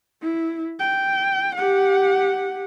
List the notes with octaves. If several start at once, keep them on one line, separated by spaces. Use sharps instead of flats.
E4
G5
G4 F#5